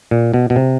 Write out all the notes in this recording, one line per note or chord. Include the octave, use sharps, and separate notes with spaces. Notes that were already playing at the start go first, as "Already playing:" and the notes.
A#2
B2
B2
C3